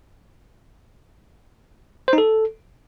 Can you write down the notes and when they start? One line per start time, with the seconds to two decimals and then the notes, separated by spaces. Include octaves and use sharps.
2.08 C5
2.13 D#4
2.18 A4